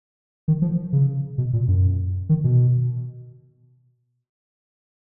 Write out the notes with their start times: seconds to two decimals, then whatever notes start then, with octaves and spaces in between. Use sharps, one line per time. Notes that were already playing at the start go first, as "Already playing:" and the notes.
0.48 D#3
0.62 F3
0.93 C#3
1.38 B2
1.53 A#2
1.68 F#2
2.29 D#3
2.44 B2